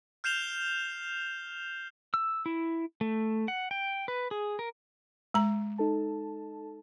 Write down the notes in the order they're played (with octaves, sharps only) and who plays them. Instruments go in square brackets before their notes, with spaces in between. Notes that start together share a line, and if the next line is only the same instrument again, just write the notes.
[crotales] F6 G6 C7 E7 F7 G7
[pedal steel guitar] E6
E4
A3
F#5
G5
B4
G#4
A#4
[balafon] G#3 A#5
[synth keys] D#4 A4 A5